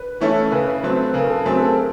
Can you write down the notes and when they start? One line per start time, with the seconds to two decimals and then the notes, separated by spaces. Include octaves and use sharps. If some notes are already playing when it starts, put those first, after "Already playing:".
Already playing: B4
0.20 E3 A3 C#4 E4
0.51 C#3 B4
0.83 F#3 A3 C4
1.14 C#3 A#4
1.30 A4
1.45 F#3 A3 C4 G#4
1.61 A4
1.77 A#4